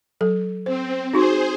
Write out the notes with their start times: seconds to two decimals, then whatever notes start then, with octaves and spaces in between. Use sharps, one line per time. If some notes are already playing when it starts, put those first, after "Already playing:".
0.21 F#3 A4
0.66 C4 C5
1.13 D#4 F#4 G#4 C5 C6